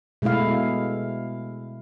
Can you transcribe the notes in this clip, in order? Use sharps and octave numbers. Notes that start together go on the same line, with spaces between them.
B2 G#3 A3 E4 F5